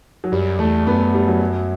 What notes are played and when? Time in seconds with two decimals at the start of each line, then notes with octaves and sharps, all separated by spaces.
0.24 F#3
0.32 F#2 G3
0.59 E2 A3
0.87 F#2 B3
1.14 G3
1.27 F#3
1.40 F#3